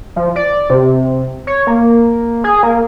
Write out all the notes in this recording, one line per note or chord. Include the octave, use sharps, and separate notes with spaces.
F3
D5
C3
C#5
A#3
G#4
A#3